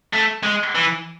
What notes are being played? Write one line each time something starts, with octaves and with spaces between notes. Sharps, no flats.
A3
G#3
E3